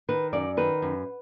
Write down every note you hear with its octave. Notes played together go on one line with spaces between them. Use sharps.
D#3 B4
F#2 D5
D#3 B4
F#2